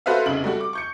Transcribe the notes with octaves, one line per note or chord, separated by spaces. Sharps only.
F#4 A4 B4 C5 E5 F5
F1 C2 C#3 F#7
G3 A3 F#4
D6
C#6 G6 C#7